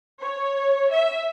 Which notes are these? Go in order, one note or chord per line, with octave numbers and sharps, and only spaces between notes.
C#5
E5